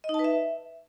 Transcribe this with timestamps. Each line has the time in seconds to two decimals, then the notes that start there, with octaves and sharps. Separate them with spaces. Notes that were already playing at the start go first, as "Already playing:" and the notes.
0.04 D#5
0.09 D#4
0.14 A5
0.19 B4
0.24 E5